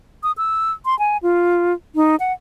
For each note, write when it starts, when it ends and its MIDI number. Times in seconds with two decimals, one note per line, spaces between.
0.23 0.32 87
0.38 0.72 88
0.85 0.98 84
0.99 1.17 80
1.23 1.74 65
1.95 2.16 63
2.20 2.33 78